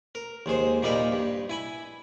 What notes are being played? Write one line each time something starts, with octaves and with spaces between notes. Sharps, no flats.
A#4
D#2 G#3 G#4 C5
A#2 G3 D#4 A#4 D#5 B5
G2
E4 G#5 B5